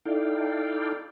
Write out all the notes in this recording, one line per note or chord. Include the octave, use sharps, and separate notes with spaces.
D#4 E4 A4 D5 F5 G5